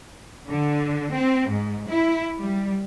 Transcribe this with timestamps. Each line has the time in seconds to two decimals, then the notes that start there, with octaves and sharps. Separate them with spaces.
0.50 D3
1.14 C4
1.50 G#2
1.90 E4
2.40 G3